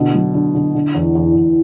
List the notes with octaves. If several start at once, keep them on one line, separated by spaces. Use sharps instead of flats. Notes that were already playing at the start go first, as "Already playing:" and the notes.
Already playing: B2 D3
F#3
D3
D3
D3
E2
E2
E2